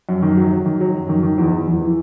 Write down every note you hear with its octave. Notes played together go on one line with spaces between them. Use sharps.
F#2
D#3
F#3
F#3
D#3
F#3
F#2
D#3
D#3
E2
E2
E2
E3